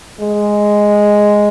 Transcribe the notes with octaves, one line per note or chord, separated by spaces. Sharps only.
G#3